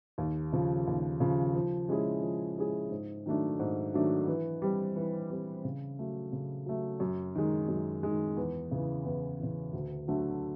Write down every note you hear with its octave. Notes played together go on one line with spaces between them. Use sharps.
D#2
C#3 F3
D#2
C#3 F3
F3
G#3 C#4 E4 G#4
F3
G#3 C#4 E4 G#4
G#2
D#3 F#3 A3 D4
G#2
D#3 F#3 A3 D4
E3
G3 C4
E3
G3 C4
C#3
F#3 A3
C#3
F#3 A3
F#2
D#3 G#3
F#2
D#3 G#3
E2
C#3 E3
E2
C#3 E3
D2
D3 F#3 A3